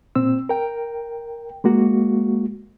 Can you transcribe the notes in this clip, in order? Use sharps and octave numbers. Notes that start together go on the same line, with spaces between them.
A#2 C4 E6
A#4 G5
G#3 A#3 F#4